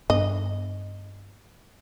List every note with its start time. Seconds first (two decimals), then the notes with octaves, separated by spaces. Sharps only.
0.10 G2 B3 D4 D#5